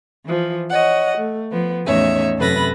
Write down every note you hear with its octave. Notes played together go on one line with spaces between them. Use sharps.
E3 F3
C#5 D#5 F#5
A3
F3 B3
E2 A2 C#4 D#4 C#5 E5
F#2 C3 A4 B4 B5 A#6